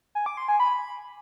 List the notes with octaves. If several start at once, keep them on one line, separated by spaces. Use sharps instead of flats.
G#5
D6
C6
G#5
B5